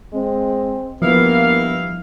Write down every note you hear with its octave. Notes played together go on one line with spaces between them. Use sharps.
G#3 C4
G2 F3 A#3 B3 E4 F5